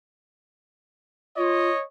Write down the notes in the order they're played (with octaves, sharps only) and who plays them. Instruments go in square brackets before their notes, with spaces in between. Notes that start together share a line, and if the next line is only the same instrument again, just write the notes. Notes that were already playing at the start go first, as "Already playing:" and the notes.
[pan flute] F4 [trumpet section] C#5 D#5